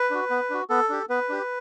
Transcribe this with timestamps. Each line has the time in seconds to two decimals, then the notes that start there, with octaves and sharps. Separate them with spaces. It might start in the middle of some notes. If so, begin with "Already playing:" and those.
Already playing: B4
0.10 D4 F#4
0.30 B3
0.50 D4 F#4
0.70 B3 A4
0.89 D4 G4
1.09 B3 B4
1.29 D4 G4